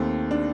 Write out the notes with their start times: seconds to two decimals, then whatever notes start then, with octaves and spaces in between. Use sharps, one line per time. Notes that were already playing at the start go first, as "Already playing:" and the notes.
Already playing: D#2 D#3 A3 C4
0.31 D4